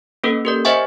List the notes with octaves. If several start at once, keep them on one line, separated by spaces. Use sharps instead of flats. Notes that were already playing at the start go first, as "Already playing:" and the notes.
A#3 C#4 A4 B4
G4 A#4 D5
C5 D#5 E5 F#5 G#5 C#6